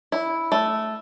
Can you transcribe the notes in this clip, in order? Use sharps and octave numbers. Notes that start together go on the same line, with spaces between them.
E4
A3